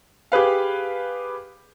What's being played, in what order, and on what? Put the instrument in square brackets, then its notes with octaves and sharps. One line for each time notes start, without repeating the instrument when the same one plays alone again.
[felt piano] G4 G#4 B4 F5